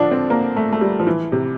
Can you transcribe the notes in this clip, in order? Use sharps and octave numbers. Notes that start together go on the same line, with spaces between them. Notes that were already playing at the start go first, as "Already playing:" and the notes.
Already playing: D3 F3 D4
C4
A#3
A3
A3
G3
F3
E3
C3